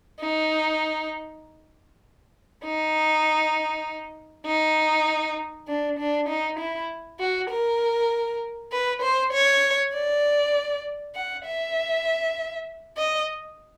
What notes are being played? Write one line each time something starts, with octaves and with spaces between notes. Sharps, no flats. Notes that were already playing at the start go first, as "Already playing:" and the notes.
D#4
D#4
D#4
D4
D4
D#4
E4
F#4
A#4
B4
C5
C#5
D5
F#5
E5
D#5